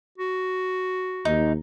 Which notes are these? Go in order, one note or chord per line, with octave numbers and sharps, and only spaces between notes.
F#4
D#2 D#4